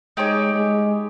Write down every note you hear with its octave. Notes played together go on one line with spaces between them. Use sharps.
G#3 D#4 G4 C#5 G5
G#3